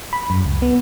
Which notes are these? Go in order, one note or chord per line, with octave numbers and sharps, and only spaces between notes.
B5
F#2
C#2
B3